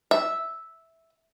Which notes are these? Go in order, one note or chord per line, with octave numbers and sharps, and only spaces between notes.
E5